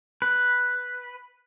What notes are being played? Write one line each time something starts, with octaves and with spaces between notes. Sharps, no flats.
B4